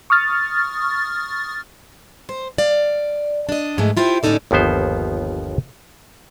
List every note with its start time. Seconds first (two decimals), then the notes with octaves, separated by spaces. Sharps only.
0.10 C#6 D#6 F6 A6
2.29 C5
2.58 D5 F5
3.49 D4 D#5
3.78 G#2 F3 G#3 A3
3.97 E4 F4 G4 C5
4.23 A2 D3 C#4 D#4 A4 D5
4.51 G1 D#2 F3 B3 C5